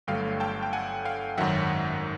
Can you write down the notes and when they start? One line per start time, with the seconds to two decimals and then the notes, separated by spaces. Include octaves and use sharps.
0.07 G1 G2 D3 F#3 A3 F5 G5
0.40 G5 A5
0.63 G5
0.73 F#5 G#5
1.05 F5 G5
1.37 G#1 F#2 D#3 F#3 E5 F#5